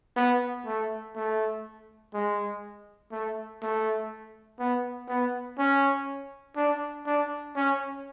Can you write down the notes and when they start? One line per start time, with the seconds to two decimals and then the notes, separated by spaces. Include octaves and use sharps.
0.16 B3
0.66 A3
1.16 A3
2.14 G#3
3.12 A3
3.62 A3
4.59 B3
5.08 B3
5.58 C#4
6.56 D4
7.07 D4
7.56 C#4